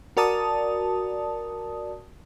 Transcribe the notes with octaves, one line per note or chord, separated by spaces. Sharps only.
F#4 A#4 D5 A5 D#6